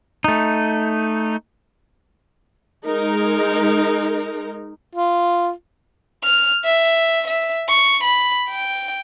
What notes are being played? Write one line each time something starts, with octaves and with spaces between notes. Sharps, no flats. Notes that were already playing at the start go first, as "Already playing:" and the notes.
A3 D#4
G#3 D#4 A#4
F4
F6
E5
E5
C#6
B5
G5